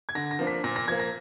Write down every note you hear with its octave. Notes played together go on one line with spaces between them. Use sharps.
G#6
D3 A#6
A#6
F3 A#3 D4
B6
A#2 A#6
A#6
F3 A#3 G#6
A#6